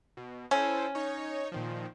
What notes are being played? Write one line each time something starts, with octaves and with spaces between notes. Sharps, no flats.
B2
C#4 E4 A4 C5
D#4 C#5
A#2 D#3 F3